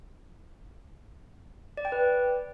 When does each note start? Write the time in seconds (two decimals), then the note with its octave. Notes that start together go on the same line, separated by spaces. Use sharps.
1.77 D5
1.85 G5
1.92 B4